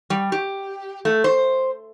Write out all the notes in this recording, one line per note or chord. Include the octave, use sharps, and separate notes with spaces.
G3
G4
A3
C5